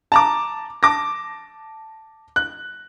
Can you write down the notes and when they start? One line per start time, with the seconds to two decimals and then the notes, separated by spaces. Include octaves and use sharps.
0.12 A5 A#5 D6
0.83 A5 D6 A#6
2.36 F#6